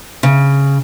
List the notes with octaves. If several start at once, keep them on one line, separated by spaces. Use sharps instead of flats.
C#3